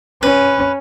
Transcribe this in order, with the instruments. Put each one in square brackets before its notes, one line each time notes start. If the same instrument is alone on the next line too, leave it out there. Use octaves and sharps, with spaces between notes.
[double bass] C#4 [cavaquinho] B4